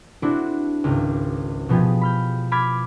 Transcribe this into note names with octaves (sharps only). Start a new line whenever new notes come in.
C4 D4 E4 F#4 A4
G#1 C#2
B2 F3 B3 G4 G#4
B5 F6 G6
B5 D6 F6 G#6 A6